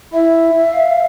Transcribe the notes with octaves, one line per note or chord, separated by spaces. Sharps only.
E4 E5
F5